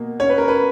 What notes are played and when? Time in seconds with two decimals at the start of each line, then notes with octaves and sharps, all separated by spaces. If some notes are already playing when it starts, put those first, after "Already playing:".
Already playing: B2 A#3
0.20 C#4 C#5
0.29 B4
0.38 A#4
0.48 B4